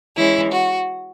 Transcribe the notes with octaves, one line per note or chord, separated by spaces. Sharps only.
E3 G#3 C#4 E4
F#4